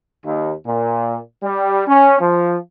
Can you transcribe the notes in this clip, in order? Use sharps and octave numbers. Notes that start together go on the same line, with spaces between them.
D#2
A#2
G3
C#4
F3